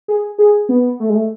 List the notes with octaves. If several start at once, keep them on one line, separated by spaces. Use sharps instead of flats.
G#4
G#4
B3
A3
G#3
A3